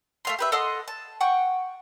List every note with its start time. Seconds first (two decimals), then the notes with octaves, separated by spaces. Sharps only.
0.25 A3 F5 C6
0.39 G4 B4 E5
0.52 A4 D#5 F#5 C6
0.88 A5
1.21 F#5 G5 C#6